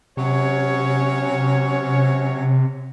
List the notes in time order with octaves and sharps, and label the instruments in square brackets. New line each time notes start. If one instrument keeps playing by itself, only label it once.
[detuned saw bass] C3 [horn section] F#3 C#4 C#5